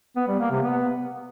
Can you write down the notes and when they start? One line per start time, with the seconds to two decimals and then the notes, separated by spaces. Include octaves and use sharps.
0.16 B3
0.28 G3
0.39 A#3
0.51 C3
0.62 B3